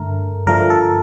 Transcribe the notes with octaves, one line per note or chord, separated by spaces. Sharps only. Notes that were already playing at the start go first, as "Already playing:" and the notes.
Already playing: G2 D3 A3 A#4
G2 D3 F3 A3 A#4
A4